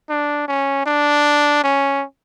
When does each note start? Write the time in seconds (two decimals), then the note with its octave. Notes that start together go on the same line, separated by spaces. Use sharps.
0.10 D4
0.48 C#4
0.86 D4
1.64 C#4